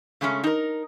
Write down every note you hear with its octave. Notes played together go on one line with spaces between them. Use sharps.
C#3 G#3 A3 C#4
D#4 A#4